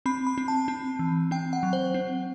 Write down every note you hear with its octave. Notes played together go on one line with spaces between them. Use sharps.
C4 B5
B5
C4
A5
C4
E3
C4 G5
F#5
F#3
C5
C4